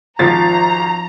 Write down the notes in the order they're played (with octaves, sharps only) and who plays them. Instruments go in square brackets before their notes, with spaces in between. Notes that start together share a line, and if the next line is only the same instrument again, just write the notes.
[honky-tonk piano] G#1 A6 [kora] F3 [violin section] A#5